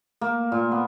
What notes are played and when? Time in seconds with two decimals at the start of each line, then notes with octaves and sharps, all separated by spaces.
0.21 A#3
0.52 A#2
0.72 B3